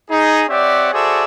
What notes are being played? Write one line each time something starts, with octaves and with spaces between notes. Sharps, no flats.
D#4 G#4
C4 G4 C#5 D5 E5 F#5
F#4 G#4 A4 C5 D5 E5